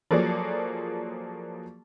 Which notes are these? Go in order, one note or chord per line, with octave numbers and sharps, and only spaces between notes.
F3 F#3 A#3 G#4 A4 D5